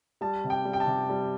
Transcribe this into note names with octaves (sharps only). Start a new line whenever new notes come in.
G3 A5
C3
G5
G3
G5
A5
C3
G3